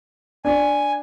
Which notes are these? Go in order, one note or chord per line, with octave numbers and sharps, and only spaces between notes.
D4 G#5